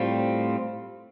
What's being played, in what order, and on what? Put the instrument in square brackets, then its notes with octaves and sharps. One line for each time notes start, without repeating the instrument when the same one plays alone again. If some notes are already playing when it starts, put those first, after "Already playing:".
Already playing: [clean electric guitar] A2 G3 C4 F4